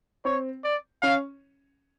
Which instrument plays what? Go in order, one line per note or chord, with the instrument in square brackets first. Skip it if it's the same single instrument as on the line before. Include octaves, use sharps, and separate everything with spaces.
[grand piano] C4 [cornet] C#5
[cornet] D5
[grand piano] C#4 [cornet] F5